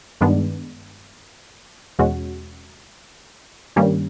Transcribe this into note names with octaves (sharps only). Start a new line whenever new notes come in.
G2 D#3 G#3 B3 D4
E2 B2 G#3 C#4 F#4
G2 D#3 G3 A#3 C#4